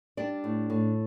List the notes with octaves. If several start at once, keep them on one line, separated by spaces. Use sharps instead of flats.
G3 D4 D5
A2
A2